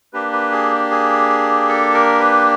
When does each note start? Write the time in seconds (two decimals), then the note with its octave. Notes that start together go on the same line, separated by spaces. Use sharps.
0.13 A#3 D4 G4 B4
0.33 B4
0.52 G#4
0.91 G#4
1.69 A4
1.94 A#4
2.20 B4